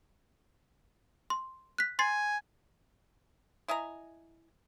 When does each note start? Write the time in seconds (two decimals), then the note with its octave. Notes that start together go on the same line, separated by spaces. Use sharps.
1.30 C6
1.78 F#6 B6
1.99 G#5 C6 A6 C7
3.68 E4 D#5 G#5 A#5